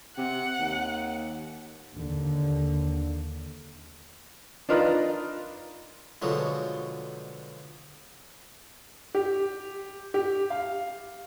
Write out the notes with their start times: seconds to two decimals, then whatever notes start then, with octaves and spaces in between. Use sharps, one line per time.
0.18 C3 F#5
0.59 D#2
1.94 D#2 D3
4.69 D4 D#4 F4 A#4 B4 D#5
6.22 B2 D3 F3 F#3 G#3
9.15 G4
10.14 G4
10.50 F5